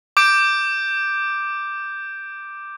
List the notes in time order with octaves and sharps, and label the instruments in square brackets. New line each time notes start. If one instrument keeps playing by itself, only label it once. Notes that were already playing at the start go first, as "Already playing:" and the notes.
[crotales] D6 G6 D7